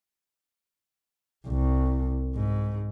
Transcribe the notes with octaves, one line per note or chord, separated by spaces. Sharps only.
C2
G#2